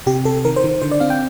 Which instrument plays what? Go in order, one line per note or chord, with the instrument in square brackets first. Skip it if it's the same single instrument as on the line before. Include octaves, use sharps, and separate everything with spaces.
[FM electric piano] C3 G4
C3 A4
D#3 A#4
C5
D#3
D3 C5
D5
C4 F5
G5